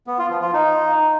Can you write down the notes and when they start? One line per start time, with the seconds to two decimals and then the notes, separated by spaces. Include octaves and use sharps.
0.07 B3
0.19 F4
0.30 F3
0.42 F4
0.53 D#4